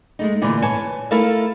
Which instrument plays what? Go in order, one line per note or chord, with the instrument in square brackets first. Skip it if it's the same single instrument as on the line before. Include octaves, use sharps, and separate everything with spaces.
[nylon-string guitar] G#3 A3 D#4
A#2 D3 E3 A3
B4 C#5 G#5 A5
A3 E4 A4 A#4 E5 F5